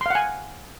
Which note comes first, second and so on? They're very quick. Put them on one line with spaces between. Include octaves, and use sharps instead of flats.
C6 F5 F#5 G#5